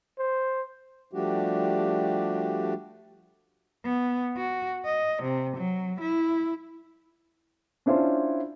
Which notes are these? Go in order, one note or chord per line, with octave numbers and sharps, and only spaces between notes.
C5
F3 G3 A3 D4 F#4 G4
B3
F#4
D#5
C3
F#3
E4
C#4 D4 E4 F4 C5